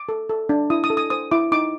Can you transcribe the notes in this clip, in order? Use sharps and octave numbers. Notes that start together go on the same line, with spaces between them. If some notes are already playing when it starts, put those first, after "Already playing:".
Already playing: D6
A4
A4
D4
E4 D#6
D#6
A4
D#6
C5 D#6
E4 D6
D#4 D6